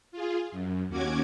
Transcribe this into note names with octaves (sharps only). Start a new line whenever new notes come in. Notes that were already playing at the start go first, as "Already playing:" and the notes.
F4 G#4
F#2
D#2 C#4 F#4 D6 G#6